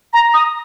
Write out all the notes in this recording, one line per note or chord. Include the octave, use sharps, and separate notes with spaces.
A#5
D#6